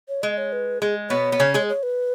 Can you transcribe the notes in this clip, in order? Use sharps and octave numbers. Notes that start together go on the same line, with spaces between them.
C#5
G#3 D#5
C#5
B4
G#3 G#4
B2 B3 C#5
B3
C#3 C#4
G#3 G#4
C#5
B4